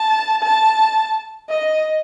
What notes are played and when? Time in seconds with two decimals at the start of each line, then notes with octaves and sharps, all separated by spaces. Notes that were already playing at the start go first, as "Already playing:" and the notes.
Already playing: A5
0.42 A5
1.49 D#5